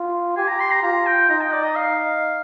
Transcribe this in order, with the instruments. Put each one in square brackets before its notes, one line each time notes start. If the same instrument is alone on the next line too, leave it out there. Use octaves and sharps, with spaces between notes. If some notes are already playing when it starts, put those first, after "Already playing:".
Already playing: [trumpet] F4
[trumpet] G4 [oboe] G#5
[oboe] A#5
C6
A#5
[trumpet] F4 [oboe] A#5
[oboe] G5
[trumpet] D#4 [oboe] A#5
[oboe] G5
D5
D#5
F5